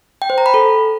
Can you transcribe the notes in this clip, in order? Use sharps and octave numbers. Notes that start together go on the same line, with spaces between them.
G5
C5
A#5
B5
A4